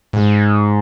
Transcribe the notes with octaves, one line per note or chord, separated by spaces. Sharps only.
G#2